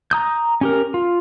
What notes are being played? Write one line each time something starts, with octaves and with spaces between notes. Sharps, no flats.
A#5 D#6 G6
C#4 G4 A#4
F4